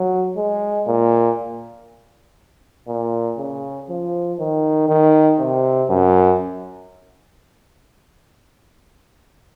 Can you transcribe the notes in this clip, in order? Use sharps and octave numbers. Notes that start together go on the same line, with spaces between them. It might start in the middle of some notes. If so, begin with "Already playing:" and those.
Already playing: F#3
G#3
A#2
A#2
C#3
F3
D#3
D#3
C3
F#2